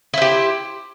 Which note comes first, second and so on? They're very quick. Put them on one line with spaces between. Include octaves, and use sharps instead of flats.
E4 C5 G4